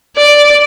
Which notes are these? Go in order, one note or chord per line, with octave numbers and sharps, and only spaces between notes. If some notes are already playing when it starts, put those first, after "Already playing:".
D5